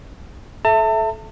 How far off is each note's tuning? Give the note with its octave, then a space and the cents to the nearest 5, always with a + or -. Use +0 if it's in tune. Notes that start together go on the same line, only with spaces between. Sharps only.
A4 -30 E5 +0 A5 +35